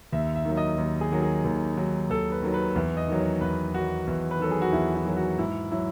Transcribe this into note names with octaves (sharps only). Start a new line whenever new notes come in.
D#2 E5
E5
D#3 F#3
D#5
D#2
G#4
D#3 F#3
G#4
D#2
D#3 F#3
D#2 A4
B4
D#3 F#3
B4
E2
D#5
D#3 F#3
C#5
E2 B4
D#3 F#3 F#4
E2
B4
D#3 F#3 A4
G#4
F#4
E2 E4
E4
D#3 F#3
F#4
G#2 E4
F#3 E4